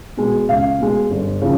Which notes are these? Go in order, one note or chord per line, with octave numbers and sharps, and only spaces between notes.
B2 G#3
C#2 F5
B2 G#3
G1
C#3 F3